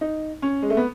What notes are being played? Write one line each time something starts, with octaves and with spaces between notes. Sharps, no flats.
D#4
C#4
G#3
A3
B3